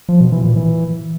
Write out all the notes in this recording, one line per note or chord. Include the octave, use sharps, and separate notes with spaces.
F3
B2
E3
A#2
E3